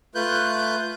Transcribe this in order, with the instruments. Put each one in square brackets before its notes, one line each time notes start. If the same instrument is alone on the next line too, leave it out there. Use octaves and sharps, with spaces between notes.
[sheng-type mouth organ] A3 F4 B4 F#6 G6